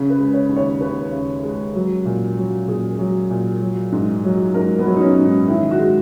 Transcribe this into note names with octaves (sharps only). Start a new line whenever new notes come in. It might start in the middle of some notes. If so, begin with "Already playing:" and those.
Already playing: C#3
B4
G#3
C#5
D#2
C#5
D#2 B4
C#3
G#3
F#3
A#2
F#3
A#2 G#4
F#3
A#2
F#3
G#2
F#3
G#2 A#4
B3
F#3
D#4
C#4
G#2
D#4
D#3 E4
F#4
G#3